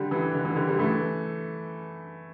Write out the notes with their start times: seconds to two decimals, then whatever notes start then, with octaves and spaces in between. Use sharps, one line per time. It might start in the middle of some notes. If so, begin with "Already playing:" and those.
Already playing: D3 G3
0.11 E3
0.34 D3
0.45 E3
0.56 D3 G3
0.68 D3 G3
0.79 E3 A3